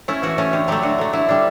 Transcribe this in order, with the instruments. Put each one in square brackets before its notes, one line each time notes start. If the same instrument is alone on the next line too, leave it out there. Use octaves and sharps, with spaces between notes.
[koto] A3 C#4 E4
E3 F#4
A3 C#4
D3 G4
F#3 A3 G4
D3 F#4
F#3 A3
D3 E4
G3 D4